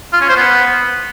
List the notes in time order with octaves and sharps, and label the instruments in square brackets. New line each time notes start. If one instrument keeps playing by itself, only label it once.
[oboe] F4
C#4
C5
B3